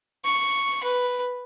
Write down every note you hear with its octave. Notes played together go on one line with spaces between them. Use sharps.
C#6
B4